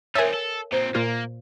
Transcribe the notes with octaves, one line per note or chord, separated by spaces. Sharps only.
C4 D#4 A#4 C#5 E5 G#5
A4
A#2 C4 C5
A#2 A#3 F4